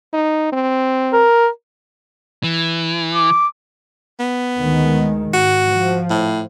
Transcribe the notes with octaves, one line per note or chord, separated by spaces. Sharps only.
D#4
C4
A#4
E3
D6
B3
D2 D#3 G#3
G#2 F#4
F3
A2